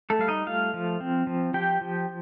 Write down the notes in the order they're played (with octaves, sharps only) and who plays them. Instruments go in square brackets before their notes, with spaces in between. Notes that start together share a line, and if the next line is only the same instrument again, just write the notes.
[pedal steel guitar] A3 A4
G3 F5
D#4 D#5
A3 F4 F5
F3
C4
F3
F3 G4 G5
F3